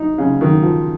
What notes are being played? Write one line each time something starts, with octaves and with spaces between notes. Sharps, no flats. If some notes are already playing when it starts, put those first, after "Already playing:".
Already playing: D#4
C#3
D#3
F3